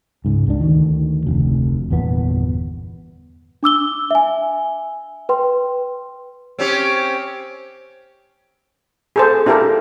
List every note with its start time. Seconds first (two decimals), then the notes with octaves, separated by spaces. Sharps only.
0.25 C#2 G#2
0.47 C#2 A3 D4
0.61 D2 D#3
1.26 F1 D2
1.90 G1 E2 A#2 B3
3.63 D4 D6 E6 G7
4.11 E5 G#5
5.29 B4 G5 C6
6.59 C4 C#4 G4
9.16 G#4 A4 C5
9.46 D4 E4 G4 A4 A#4